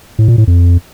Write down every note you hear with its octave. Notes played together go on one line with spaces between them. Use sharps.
A2
A#2
A2
F2